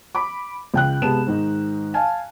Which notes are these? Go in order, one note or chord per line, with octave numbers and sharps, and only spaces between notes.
B5 D6
C#2 G5 F#6
C3 G#3 B3 A5 E7
G#2 D#3 D#4
F5 G#5 A5